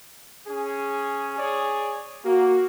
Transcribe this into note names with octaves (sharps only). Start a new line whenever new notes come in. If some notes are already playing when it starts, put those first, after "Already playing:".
C#4 G#4
G#4 C#5 D5
A#3 F#4